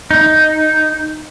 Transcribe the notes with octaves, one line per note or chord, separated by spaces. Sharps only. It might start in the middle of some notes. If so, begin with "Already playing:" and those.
D#4